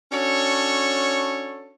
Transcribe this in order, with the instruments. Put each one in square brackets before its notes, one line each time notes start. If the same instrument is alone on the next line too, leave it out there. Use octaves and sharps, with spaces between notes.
[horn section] C#4 D4 F#4 A4 C#5